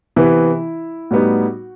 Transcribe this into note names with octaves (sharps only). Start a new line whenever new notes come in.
C3 E3 B3 E4
A2 G3 B3 D#4 F#4